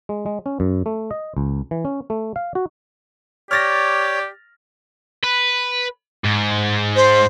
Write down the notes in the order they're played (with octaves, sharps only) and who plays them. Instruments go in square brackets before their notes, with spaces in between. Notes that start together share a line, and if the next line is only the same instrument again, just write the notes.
[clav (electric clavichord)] G#3
G#3
C#4
F#2
A3
D#5
C#2
E3
C#4
A3
F5
F#4
[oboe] G4 [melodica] C#5 [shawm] D5 [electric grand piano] F6 A6 A#6
[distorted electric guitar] B4
G#2
[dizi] C5